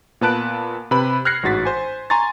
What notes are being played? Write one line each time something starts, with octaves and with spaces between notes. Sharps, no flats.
A#2 B3 B4 A5 F#6 D7
C3 B4 B5
F6 F#6 G#6 A#6 C7 C#7
A1 G#2 F#4 A6 B6
C5 G#5
G#5 A#5 C6 C#6 A6